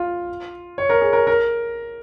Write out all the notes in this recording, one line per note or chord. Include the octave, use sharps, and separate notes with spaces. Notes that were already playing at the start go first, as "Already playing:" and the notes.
Already playing: F4
C#5
A#4
G#4
A#4
A#4